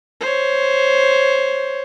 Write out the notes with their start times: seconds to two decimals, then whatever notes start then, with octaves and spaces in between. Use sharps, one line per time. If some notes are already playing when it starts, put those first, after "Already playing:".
0.21 C5 C#5